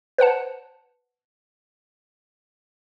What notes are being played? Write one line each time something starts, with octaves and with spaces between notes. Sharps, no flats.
B4 C5 F#5 A5